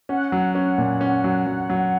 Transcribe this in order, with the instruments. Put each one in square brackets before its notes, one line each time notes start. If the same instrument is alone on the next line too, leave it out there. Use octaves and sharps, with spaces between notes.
[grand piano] C#4 [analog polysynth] F#5
[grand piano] F#3
C#4
A#2
C#4
F#3
F#3
F#3